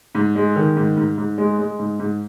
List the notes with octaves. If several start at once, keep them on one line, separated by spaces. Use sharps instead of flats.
G#2
G#3
D#3
G#2
G#2
G#2
G#3
G#3
G#2
G#2